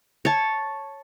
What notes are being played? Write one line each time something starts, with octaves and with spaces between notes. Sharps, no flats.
C#5 A5